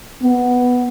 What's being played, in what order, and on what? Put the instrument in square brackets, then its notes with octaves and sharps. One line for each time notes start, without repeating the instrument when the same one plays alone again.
[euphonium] B3